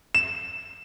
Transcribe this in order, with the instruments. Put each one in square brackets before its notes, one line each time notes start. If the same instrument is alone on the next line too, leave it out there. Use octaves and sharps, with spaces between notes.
[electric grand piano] E7